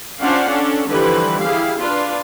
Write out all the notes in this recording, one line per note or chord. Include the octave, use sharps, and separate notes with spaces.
C#4 D4 F4 C5 F5 F#5
C#4 D4 A4
D3 E3 F3 G3 E4 B4
E4 G4 G#4 F5
D4 F4 B4